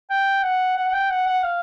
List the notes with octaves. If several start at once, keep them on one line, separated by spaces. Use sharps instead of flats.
G5
F#5
F#5
F#5
G5
F#5
F#5
F5